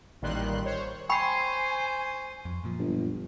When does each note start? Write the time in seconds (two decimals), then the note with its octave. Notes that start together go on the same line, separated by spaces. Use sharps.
0.22 A1 A#2 D#3 G3 C6 F#6
0.65 C5 C#5
1.10 C5 G5 G#5 B5 C#6 C7
2.45 F2
2.64 F#2 A#2 F3
2.79 G1